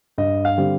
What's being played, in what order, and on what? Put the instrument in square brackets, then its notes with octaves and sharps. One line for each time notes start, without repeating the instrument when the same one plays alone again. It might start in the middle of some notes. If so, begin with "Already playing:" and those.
[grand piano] G2 D#5
F5
D3 G3 C4